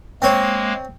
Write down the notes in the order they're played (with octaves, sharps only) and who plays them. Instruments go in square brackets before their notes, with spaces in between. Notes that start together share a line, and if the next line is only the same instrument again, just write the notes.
[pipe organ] G#3 A#3 [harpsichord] C4 C#5